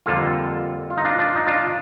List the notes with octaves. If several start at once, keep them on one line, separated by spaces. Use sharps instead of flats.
F2 D3 G3 A#3 F4 A4
F4
D#4
D4 F4
D4 F4
D#4
D4 F4